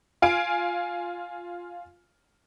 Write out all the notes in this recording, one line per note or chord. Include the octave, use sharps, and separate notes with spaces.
F4 F5 G#5 D7